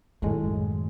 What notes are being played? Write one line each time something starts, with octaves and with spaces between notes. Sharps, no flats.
F#2 A2 D#3 G#3 A3